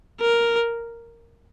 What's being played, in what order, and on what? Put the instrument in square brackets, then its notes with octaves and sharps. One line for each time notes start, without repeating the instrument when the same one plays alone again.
[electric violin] A#4